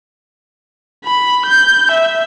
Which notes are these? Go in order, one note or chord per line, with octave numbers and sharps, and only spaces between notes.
B5
G6
E5